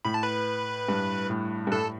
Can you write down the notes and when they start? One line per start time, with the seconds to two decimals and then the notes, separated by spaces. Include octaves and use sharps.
0.05 A2 B5
0.14 A5
0.23 B4 B5
0.89 G2
1.30 A2
1.67 G2
1.72 A2 A4 A5